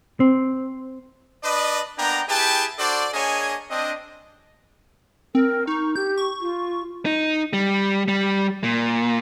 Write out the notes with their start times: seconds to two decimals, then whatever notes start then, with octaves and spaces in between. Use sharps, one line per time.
0.20 C4
1.43 D4 B4 D5 D#5
1.98 A#3 B3 D4 G5 A#5
2.28 E4 G4 G#4 B4 G5 A5
2.79 D4 F#4 A4 C5 D5
3.14 A#3 D4 G#4 C#5 D#5 G#5
3.70 C4 D4 D#5
5.35 C4 A#4
5.67 D#4 C#6
5.96 G4 G6
6.17 C#6
6.41 F4
7.06 D#4
7.53 G3
8.08 G3
8.63 A#2